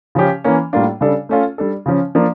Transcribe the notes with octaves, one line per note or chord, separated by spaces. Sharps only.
C#3 F3 C#4 G4
E3 A#3 C#4
A2 G3 A#3 D4 F4
C#3 G3 D4 A4
A3 C#4 F4 A4
G3 D4 A4
C#3 F3 C#4
F3 A#3 D4